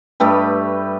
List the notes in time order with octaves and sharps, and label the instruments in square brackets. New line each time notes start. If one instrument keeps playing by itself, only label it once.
[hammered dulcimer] G2 A3 G4 B4